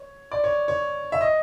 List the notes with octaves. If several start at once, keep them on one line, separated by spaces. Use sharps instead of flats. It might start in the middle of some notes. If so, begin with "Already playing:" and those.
Already playing: C#5
D5
C#5
C#5
E5
D#5